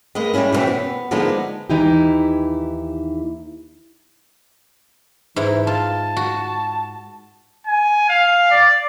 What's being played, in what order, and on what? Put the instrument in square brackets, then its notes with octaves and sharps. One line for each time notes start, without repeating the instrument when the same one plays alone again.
[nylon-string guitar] G#3 A#3 B4 D#5
G3 G#3 C4 C#4 E4
B2 D3 E3 C4 C#4
B3
D3 F3 G#3 A#3 B3 D#4
[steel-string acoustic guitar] D#2 E3 D#4 E4 G4
[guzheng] G#2 E4 [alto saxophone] E3
[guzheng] F4 [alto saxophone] A5
[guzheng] F#4
[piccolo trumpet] G#5
F5
D5